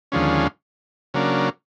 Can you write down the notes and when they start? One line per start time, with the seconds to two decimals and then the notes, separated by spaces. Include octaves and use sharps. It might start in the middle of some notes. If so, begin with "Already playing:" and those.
0.12 D#2 D3 F3 G#3 C#4
1.14 C#3 F#3 A#3 D4